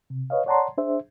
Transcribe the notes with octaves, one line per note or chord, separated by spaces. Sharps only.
C3
B4 C#5 D#5 F5
C#5 D5 F#5 A5 A#5 C6
D4 G#4 C5 E5